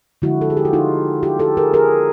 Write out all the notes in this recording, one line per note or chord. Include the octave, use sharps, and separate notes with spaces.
D3 F3 G#3 E4 F#4
A4
G#4
G4
F#4
D#4 F4
F4 G4
G4 A4
G#4 A#4
G#4 A#4